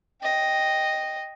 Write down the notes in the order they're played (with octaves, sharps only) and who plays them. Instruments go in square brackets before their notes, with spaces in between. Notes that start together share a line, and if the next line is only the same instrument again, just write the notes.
[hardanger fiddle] D#5 G5